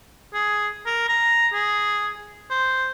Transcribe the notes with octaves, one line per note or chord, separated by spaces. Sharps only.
G#4
A#4
A#5
G#4
C5